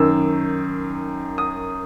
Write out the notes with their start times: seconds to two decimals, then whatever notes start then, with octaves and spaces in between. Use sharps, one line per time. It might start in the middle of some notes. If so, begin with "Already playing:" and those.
Already playing: F#2 D#3 E6
1.38 D#6